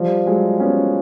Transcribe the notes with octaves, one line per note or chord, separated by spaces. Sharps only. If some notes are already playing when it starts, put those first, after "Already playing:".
Already playing: F3 G3
F#3 G#3
B3 C#4